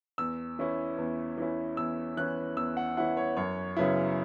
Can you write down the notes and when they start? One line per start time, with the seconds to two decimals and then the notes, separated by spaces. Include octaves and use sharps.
0.18 E2 E6
0.59 E3 C#4 E4
0.98 E2
1.38 E3 C#4 E4
1.77 E2 E6
2.17 E3 C#4 E4 F#6
2.57 E2 E6
2.77 F#5
2.97 E3 C#4 E4 F#5
3.17 C#5
3.37 F#2 C#5
3.77 C#3 F#3 B3 E4